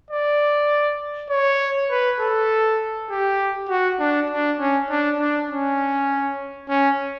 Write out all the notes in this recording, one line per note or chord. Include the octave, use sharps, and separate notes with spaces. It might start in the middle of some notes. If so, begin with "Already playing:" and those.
D5
C#5
B4
A4
G4
F#4
D4
D4
C#4
D4
D4
C#4
C#4